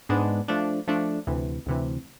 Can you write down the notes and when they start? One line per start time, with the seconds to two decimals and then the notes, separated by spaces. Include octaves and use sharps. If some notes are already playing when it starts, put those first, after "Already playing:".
0.09 G#2 G#3 B3 D4
0.48 F3 A3 D4
0.87 F3 A3 D4
1.27 D2 C3 E3
1.66 D2 C3 E3